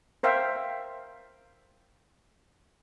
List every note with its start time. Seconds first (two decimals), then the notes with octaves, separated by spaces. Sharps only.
0.23 A#4 C5 E5 F5 G5